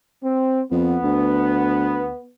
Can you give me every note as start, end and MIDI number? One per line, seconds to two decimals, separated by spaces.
0.22 0.61 60
0.71 0.98 41
0.71 2.33 59
1.03 2.11 38